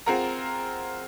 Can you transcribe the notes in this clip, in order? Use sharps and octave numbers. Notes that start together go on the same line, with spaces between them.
C4 F4 G#4 A#4 F#5 A#5